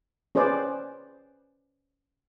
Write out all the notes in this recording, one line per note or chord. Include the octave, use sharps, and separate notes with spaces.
C#4 G#4 B4 C5 D5